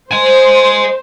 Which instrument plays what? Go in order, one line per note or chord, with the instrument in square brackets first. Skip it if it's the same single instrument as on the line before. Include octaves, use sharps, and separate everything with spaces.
[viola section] C5 [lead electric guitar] D#5 G#5